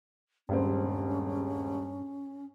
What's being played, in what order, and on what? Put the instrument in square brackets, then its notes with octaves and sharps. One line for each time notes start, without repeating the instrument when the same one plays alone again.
[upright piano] D#1 C#2 C4 [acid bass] G2 [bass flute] C#4